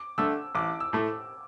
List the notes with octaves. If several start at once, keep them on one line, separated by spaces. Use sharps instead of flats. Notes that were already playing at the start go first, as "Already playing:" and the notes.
Already playing: D6
D3 A3 E6
A1 D6
E6
A2 A3